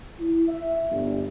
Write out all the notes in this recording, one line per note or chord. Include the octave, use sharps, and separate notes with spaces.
E4
E5
G1